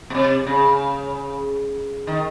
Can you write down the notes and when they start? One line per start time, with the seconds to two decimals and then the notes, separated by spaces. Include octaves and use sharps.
0.10 B2
0.15 C3
0.47 C#3
2.07 D#3